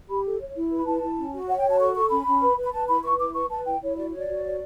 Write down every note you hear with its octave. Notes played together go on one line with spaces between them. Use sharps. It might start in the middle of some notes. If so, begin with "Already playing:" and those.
G4 B5
A4
C#5
E4
B4
B5
E4 A5
E4
C#4
F#4
C#5 F#5
G5
F#4
A5
A4 C#6
A4 C#6
C#4 B5
C#4
B4
B4
B5
B4 A5
E4 B5
B4 C#6
E4 D6
B4 C#6
B4 A5
E4 G5
E4 C#5
F#4 D5
C#5 D5
F#4
C#5